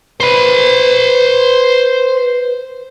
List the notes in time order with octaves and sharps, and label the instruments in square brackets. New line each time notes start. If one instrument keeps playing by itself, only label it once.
[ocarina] B4 [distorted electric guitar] C5 B5